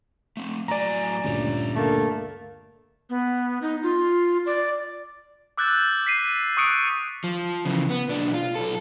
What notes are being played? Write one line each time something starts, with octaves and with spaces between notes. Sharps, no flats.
A3 C4
A2 F#3 D5 G#5 A#5
D2 G2 A#2 C#4 G4 C#5
D3 A3 A#3
B3
D#4
F4
D5
D6 E6 F#6 G6 A6
B6 C7 D#7
C#6 D#6 F#6 C#7 D7
F3
C#3 E3
B3
B1 D4
F4
B1 A4